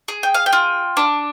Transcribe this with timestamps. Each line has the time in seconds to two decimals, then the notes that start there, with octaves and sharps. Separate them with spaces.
0.08 G#4
0.23 G5
0.34 F5
0.46 G5
0.53 F4
0.97 D4